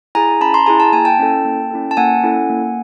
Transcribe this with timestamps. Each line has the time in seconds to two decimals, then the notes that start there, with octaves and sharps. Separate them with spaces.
0.15 E4 G#4 G#5 A#5
0.41 C#4 A5 B5
0.54 A#5 C6
0.66 E4 G#4 G#5 A#5
0.80 A5
0.93 A#3 G#5
1.05 G5 A5
1.19 C#4 E4 A4
1.45 A#3
1.71 C#4 E4 A4
1.91 A5
1.97 A#3 F#5 G#5
2.23 C#4 E4 A4
2.49 A#3